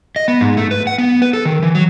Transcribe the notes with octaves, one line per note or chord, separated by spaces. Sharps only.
D#5
B3
G#2
A3
B4
F#5
B3
B4
A4
D#3
E3
F#3